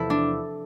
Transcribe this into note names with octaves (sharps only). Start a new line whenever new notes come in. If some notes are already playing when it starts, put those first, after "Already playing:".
Already playing: E2 C3 F3 E4 A4
D4